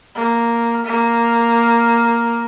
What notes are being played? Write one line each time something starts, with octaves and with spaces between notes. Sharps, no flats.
A#3
A#3